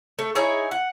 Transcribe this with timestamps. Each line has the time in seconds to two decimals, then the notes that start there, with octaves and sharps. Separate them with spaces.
0.19 A3
0.35 D#4 E4 G#4 C#5
0.71 F#5